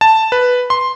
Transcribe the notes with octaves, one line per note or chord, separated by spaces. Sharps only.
A5
B4
C6